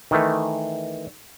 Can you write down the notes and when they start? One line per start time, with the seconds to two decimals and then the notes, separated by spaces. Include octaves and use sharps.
0.11 D#3 E3 A3